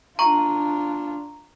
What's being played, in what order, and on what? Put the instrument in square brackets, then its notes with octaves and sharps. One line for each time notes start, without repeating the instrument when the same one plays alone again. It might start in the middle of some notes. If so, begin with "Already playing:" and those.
[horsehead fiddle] D4 F4 [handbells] A#5 C#6